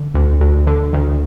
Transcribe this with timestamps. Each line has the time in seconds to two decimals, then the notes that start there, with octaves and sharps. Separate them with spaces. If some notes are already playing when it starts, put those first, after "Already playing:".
Already playing: D3
0.14 D2
0.40 D2
0.67 D3
0.93 D2